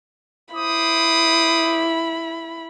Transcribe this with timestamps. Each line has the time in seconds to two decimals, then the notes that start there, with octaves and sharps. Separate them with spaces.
0.55 E4 C5 B5 D6 D#6